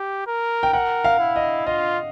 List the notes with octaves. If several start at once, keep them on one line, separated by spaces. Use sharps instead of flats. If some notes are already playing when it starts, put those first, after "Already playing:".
Already playing: G4
A#4
G5
A#4 F#5
F5
E4
D#5
F4 D#5